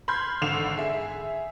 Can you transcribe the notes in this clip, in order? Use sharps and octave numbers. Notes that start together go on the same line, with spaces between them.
B5 C6 F6 G6 G#6
G#1 D3 C7 E7 F7
G#4 E5